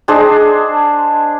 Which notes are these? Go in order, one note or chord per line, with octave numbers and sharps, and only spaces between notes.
D4 G#4 C5 D#5